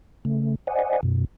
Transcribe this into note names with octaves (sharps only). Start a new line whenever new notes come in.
C#3 A3
C5 D5 D#5 F#5 G#5
F#2 B2